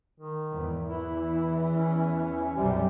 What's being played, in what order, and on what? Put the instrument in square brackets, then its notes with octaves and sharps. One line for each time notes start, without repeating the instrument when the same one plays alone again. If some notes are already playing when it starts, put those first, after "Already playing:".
[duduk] D#3
[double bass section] E2 G#2
[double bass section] E2 E3 [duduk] E4
[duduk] C#4
[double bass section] B1 F#2 G3 [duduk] C3